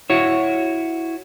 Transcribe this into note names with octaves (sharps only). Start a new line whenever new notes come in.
E4 F#4 C#5